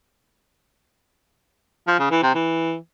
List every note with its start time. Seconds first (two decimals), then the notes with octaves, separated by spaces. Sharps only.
1.87 F3
1.99 C#3
2.11 E3
2.23 C3
2.35 E3